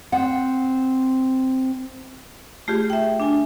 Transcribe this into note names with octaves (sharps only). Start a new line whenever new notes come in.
C4 F#5
A3 F4 G4 G#4
E5 G5
D4 G#5